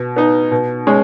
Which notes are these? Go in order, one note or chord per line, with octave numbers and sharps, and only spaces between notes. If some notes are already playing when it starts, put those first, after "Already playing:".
Already playing: B2
B3 D#4
B2
G#3 C#4